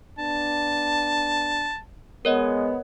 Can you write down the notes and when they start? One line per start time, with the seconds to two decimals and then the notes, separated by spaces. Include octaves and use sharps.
0.19 B3 D4 A5
2.25 G#3 B3 A#4 C#5 D#5